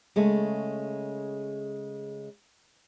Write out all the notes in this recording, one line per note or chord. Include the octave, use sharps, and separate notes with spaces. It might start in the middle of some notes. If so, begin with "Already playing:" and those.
C#3 G#3 A3